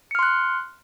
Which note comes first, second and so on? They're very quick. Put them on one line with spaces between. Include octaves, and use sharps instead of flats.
C#7 F6 C6 F#6